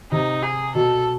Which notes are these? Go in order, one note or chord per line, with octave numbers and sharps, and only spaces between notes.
C3 D#4
G#4
B2 A4